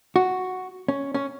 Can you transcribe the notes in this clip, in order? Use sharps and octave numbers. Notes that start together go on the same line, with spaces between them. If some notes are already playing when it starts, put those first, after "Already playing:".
F#4
C#4
C#4